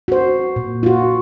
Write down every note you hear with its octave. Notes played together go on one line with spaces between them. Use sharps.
F#4 C5
A#2
F4 F#4